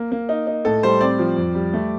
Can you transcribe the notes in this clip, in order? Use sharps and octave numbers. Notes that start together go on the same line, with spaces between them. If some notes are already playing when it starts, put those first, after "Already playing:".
Already playing: A#3
A#3
D#4
D#4
A2 A4
G3 C5
C4 D5
F3
F2
G3
A3